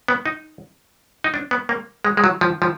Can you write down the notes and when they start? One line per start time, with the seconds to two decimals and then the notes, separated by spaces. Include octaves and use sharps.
0.08 B3
0.26 D#4
1.24 D#4
1.34 D4
1.51 B3
1.69 A#3
2.05 G#3
2.17 G#3
2.24 F#3
2.41 F3
2.62 F3